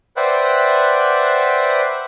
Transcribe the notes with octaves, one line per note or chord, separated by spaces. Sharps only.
B4 C5 D5 E5 F#5 G5